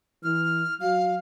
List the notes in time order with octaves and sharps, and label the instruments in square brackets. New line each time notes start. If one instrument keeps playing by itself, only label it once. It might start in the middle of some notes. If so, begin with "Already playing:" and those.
[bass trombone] E3 [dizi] F6
[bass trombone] F#3 [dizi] F5